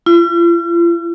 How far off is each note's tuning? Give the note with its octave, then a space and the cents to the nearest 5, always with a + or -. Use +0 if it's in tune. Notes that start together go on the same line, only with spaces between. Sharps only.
F4 -45